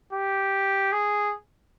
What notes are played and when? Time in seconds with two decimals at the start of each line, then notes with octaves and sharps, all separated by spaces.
0.13 G4
0.92 G#4